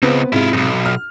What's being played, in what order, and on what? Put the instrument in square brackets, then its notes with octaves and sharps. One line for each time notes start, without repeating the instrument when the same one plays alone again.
[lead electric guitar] C#2 [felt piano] B3 C4 B4
[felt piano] G#2 C3 [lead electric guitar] E4 F4
[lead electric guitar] B1 F#2
[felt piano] F6